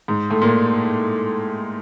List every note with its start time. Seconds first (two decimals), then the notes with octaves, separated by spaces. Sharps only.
0.08 G#2
0.30 A2
0.42 A#2